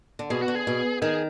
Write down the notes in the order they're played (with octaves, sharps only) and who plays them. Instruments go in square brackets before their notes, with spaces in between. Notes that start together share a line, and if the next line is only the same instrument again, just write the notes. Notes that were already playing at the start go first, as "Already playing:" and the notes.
[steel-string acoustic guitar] D3
[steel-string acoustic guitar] B2 [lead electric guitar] G#4
[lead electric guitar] F#4
[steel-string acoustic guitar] D3
[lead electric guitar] G#4
[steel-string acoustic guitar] B2
[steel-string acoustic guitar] D#3 [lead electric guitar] G#4